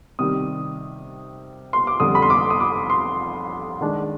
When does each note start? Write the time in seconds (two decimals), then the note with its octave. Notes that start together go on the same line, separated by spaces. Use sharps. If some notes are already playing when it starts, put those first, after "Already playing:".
0.19 C3 D#3 G3 D#6
1.73 C6
1.87 D6
2.00 F2 D3 G3 D#6
2.15 B5
2.22 C6
2.30 D6
2.50 D#6
2.60 D6
2.90 C6
3.81 D#3 G#3 D4